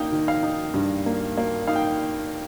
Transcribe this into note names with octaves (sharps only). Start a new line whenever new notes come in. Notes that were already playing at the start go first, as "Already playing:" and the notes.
Already playing: A#3 D#4 G5
D#3
F5
D#4
G2
A#3
A#3
D#4 F5
G5